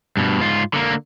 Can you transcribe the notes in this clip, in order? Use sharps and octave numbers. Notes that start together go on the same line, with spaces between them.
G2 B2
G#2 F4
D3 A#3